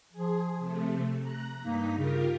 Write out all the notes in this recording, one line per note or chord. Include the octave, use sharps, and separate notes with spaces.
F3 G#4
C3 A3
A#5 F#6
G2 A#3 D#4 B6
C#3 F4 G4 A#4